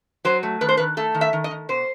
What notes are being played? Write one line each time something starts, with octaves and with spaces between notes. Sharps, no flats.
F#3 C5
A3
D#3 B4
C5
D#3 B4
A3 A4
D#3
E5
D#3
D#5
D#3
B2 C5